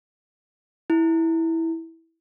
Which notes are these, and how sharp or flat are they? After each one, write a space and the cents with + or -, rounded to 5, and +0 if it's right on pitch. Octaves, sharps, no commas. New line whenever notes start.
E4 -10